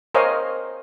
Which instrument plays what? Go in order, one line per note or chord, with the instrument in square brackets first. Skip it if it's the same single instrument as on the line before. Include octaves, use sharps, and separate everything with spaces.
[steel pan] A#4 C5 C#5 D#5 F5 G#5